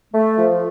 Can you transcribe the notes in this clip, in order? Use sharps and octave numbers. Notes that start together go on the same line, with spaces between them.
A3
F3